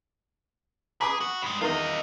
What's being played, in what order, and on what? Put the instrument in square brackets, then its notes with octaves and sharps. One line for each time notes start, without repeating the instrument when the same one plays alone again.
[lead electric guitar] G#4 [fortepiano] B5 D6 D#6
[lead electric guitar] F#4
G2 G#3
[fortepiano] E2 D#3 [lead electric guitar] F4 D#5